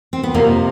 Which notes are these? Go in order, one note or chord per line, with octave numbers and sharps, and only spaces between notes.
C4
B3
F2 C3 F3 A#3